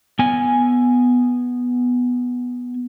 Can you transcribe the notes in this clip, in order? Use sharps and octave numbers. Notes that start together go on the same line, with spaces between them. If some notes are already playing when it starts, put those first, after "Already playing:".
B3 G#5